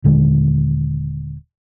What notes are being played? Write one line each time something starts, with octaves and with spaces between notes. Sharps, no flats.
D#1 D3 G#3